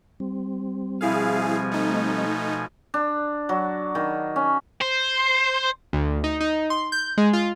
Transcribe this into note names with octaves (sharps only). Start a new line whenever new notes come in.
G3 C4
B2 F3 E4 G#4 F5 G#5
A3 D#4
D4
F#3
D#3
C#4
C5
D2
D#4
D#4
C6
G6
G#3
F4